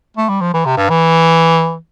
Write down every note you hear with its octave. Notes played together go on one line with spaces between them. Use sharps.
A3
G3
F3
E3
C3
G2
E3